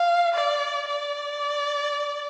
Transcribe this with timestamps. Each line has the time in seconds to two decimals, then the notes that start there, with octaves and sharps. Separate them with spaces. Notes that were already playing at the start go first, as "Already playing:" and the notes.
Already playing: F5
0.34 D5
0.88 D5